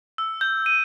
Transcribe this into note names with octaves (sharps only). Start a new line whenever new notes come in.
E6
G6
D#7